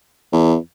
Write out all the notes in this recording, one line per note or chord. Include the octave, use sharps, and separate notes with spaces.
E2